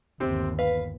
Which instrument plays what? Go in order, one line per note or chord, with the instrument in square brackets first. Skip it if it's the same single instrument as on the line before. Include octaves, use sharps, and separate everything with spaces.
[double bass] G1 D#2 [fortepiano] C3 C4
[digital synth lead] B4 [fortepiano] F5